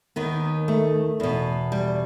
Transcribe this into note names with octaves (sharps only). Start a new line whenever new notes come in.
D#2 D#3 B3
A3
E2 B2
G3